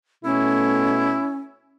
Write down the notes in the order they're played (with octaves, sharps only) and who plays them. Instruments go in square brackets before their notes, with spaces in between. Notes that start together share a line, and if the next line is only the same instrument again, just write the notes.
[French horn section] B2 A3 [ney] C#4 [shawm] E4